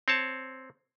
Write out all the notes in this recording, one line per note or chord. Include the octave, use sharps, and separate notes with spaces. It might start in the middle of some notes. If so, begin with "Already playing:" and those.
C4 C#5 A5